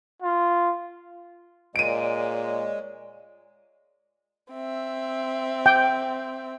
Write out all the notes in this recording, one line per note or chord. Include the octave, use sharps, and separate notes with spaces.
F4
A#2 G#3 C#5 D5 D7 D#7
C4 E5
G5